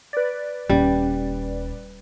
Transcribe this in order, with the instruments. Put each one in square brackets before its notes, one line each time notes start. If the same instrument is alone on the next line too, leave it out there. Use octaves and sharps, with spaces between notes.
[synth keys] B4 D5
[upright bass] D#1 C#4 [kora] G3